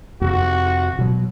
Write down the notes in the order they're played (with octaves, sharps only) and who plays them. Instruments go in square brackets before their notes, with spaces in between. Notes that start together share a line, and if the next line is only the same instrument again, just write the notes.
[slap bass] F2 C3 [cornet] F#4
[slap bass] B2 F#3